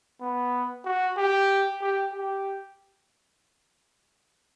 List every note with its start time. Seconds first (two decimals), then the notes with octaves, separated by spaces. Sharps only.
0.21 B3
0.85 F#4
1.18 G4
1.81 G4
2.13 G4